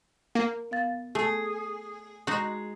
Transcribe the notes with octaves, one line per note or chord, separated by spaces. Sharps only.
A#3 A#4
B3 F5 A6
A3 G#4
G#3 D#4 F#4